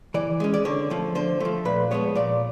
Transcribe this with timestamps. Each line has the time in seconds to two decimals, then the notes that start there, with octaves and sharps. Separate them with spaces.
0.14 E3 D5
0.40 G#3 C#4
0.54 D5
0.65 D3 C#5
0.90 F3 A3
1.15 D3 C5
1.40 F3 A3
1.65 A#2 B4
1.91 F3 G#3 B3 C#5
2.15 A#2 D5